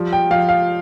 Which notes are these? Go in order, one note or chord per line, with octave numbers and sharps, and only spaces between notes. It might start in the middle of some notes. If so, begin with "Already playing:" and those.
Already playing: F3 G3
G5
F3 F5
F5